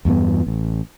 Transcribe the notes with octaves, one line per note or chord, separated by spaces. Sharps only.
E2 G2 A#3 B3
A1